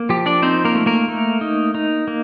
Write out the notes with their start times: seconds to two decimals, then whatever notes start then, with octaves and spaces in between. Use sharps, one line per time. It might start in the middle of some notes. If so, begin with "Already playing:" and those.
Already playing: A#3
0.09 F3 G4
0.26 D4 D5
0.42 C4 D#4 C5
0.65 A#3 A#4
0.75 A3
0.86 A#3 A#4
1.08 A3
1.41 D#4
1.75 D#4
2.08 A#3